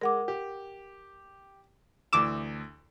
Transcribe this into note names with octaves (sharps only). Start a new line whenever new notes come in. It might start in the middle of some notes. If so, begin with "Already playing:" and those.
G#3 A#4 F#5 D6
G4
D2 E3 D6 E6 E7